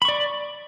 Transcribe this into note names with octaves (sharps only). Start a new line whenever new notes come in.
D5 B5 C#6